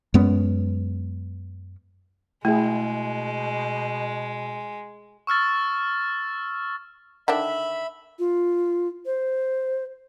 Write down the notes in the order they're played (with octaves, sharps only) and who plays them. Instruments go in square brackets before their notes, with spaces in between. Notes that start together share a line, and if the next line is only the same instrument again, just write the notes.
[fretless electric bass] F#2 G#3 B3 C#4
[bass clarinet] B2 [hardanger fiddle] G#3 [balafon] A3 [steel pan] E4 G#4
[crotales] C#6 E6 F6 A6
[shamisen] D3 D#3 D4 [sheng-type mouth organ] E5 B5
[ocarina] F4
C5